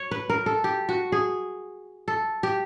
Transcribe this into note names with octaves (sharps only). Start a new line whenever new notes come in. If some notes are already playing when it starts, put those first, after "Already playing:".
Already playing: C#5
B4
A#4
A4
G4
F#4
G#4
A4
G4